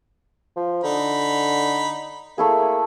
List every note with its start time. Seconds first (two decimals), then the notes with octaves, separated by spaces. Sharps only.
0.56 F3
0.84 D3 D#4 B5
2.38 A3 A#3 E4 G#4